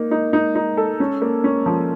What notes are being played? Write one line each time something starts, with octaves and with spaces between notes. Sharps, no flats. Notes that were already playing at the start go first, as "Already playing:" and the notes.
Already playing: A#3 D#4
D#4
D#4
D#4
A4
C#4
A#3
C#4
F3